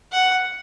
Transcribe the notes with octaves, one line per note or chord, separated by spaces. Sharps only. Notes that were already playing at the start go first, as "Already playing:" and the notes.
F#5